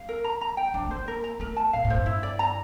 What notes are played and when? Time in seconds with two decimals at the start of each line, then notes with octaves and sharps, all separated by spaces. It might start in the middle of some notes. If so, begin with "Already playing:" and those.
Already playing: G3 F5
0.09 A#4
0.24 A#5
0.41 A#5
0.57 G5
0.74 F3 D4
0.85 A3
0.91 C5
0.96 A#3
1.08 A#4
1.24 A#5
1.40 A3 A#4
1.57 A5
1.73 A#2 F5
1.85 A2
1.90 G2 C5
2.06 E4
2.23 D5
2.39 A#5